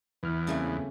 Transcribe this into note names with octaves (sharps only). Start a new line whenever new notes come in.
E2 E3 F6
C#3 G3 A3 A#3 C4 G#4